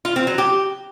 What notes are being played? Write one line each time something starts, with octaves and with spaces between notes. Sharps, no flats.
F4
C4
F#3
G4